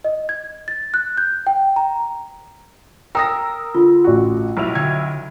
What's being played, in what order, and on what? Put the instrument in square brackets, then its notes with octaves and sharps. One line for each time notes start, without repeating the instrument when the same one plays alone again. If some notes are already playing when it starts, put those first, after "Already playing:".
[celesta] D#5
G#6
A6
F#6
G6
G5
A#5
[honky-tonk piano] A#4 E6 [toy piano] G5 [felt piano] A#5 D#6 A#6
[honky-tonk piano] D3 [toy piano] F4
[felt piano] A1 F#4
[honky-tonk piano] B1 E4 F7
[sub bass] D3 [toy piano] G5 [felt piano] G#6